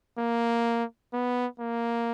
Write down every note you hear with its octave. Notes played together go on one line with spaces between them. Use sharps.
A#3
B3
A#3